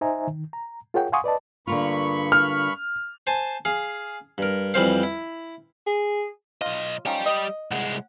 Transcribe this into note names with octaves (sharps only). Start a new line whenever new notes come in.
D#4 C5 D#5 E5 G#5 A#5
D#3
A#5
F4 G#4 A#4 C#5 F#5 G5
F5 F#5 G#5 C6 C#6 D#6
B4 D5 D#5 A5
G2 D3 A#3 F4 B5 C#6
F6
C5 G#5 A5
G#4 F5
G2 A#4
F2 E3 G3 C4 C5 F5
E4
G#4
B1 F4 D#5
F3 G3 C#4 D#4 G5
D#5
C2 G#3 F#5